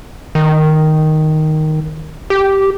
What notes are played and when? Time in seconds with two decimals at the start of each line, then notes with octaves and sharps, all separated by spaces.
0.35 D#3
2.30 G4